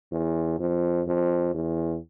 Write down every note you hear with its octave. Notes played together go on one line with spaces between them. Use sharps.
E2
F2
F2
E2